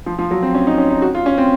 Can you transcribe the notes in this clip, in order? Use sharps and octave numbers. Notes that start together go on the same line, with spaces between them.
F3
F3
F#3
C4
C#4
D#4
C#4
D#4
F#4
F4
C#4
C4